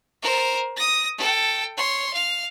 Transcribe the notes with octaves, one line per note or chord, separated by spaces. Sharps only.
A#4 C5
D#6 A#6
A4 G5
C#5 C6
F5